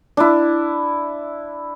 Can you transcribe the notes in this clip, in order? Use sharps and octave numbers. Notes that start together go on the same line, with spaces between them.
D4 E4